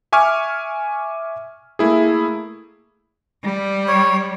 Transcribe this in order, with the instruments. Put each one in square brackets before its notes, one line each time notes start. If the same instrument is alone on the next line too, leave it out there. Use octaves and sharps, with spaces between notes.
[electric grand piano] E5 G#5 C#6 D6 F6
A3 A#3 E4 G#4
[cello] G3
[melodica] C#5